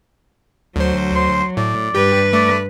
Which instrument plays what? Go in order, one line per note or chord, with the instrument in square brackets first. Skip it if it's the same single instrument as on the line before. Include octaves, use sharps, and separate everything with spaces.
[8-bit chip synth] D2 C5 [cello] F#3
[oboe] C6
[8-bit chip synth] A2 [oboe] D5
[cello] G2 B4 [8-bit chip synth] G4
[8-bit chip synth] A3 [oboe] D5